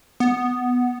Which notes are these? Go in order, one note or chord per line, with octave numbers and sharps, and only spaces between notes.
B3